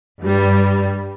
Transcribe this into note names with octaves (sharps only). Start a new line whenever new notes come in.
G2 G3